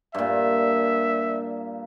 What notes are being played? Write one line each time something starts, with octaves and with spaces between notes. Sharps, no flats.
G2 A#2 E5